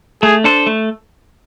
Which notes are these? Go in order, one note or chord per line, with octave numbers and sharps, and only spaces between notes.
A3 G#4
D4 A4 C5
A3